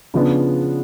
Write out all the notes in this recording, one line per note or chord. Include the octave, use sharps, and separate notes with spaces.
C#3 F3 B3 D4